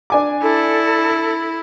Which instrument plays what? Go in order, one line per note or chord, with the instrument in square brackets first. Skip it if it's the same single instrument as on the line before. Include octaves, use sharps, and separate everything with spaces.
[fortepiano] D4 G#5 D6
[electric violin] E4 [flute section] A4